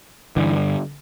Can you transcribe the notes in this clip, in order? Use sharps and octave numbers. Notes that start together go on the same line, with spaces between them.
G2 D3 E3